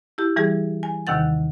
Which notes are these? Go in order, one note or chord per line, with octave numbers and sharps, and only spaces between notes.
E4 G4
E3 G3 G#4
G#5
D#2 C3 D#3 F#5 A6